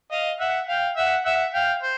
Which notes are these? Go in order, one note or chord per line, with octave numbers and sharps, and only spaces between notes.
D#5 F5
E5 F#5
F5 G5
E5 F#5
E5 F#5
F5 G5
C5